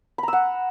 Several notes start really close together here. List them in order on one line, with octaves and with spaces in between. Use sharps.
B5 A#5 E6 F#5